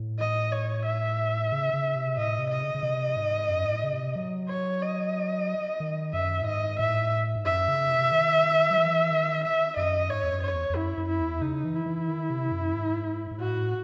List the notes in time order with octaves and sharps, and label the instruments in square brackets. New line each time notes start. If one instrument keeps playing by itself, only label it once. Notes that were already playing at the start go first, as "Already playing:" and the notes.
Already playing: [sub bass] A2
[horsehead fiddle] D#5
C#5
E5
[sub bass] C#3
C#3
C3
[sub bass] A2 [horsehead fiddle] D#5
[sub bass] C3
[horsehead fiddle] D#5
[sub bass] C#3
C#3
C3
G#2
F#2
G#2
A2
C#3
C3
F#3
[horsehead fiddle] C#5
D#5
[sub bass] D#3
[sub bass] F#2 [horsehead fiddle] E5
[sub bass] A2
[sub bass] G#2 [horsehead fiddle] D#5
[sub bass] A2 [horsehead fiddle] E5
[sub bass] G#2
[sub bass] F#2 [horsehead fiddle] E5
[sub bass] C#3
C3
D#3
F#3
E3
D#3
[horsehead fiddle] E5
[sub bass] F#2 [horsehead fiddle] D#5
[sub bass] G#2 [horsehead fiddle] C#5
[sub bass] E2
F#2
[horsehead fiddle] C#5
[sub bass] E2
E2
[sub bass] F#2 [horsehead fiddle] E4
[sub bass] F#2
[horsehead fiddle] E4
[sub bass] E2
[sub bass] C#3 [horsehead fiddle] D#4
[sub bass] E3
[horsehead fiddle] E4
[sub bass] E3
D#3
C3
F#2
G#2
G#2
[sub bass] A2 [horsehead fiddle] F#4